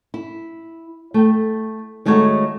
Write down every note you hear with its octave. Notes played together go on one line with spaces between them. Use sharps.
E4
A3 G5
D#3 G#3 A3 F#4 C#5